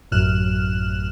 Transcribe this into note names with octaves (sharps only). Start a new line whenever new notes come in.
A1 F#2 F6 F#6 E7